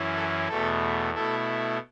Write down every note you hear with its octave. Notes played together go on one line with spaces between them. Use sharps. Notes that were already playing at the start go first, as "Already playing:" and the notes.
Already playing: F#2 E3 C#4 E4
A4
E2 B2 A3 A4
B2 A3 E4 A4